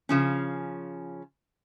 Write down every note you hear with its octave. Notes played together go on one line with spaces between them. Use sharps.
C#3 F3 C#4